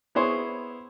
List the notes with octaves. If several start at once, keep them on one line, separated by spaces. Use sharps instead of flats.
B3 E4 G#4 C5 C#5